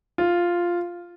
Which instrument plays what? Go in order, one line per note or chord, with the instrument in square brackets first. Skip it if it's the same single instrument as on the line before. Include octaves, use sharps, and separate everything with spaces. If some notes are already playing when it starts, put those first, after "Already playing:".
[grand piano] F4